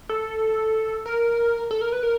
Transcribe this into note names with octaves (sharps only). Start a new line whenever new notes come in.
A4
A#4
A4
A#4
B4
A#4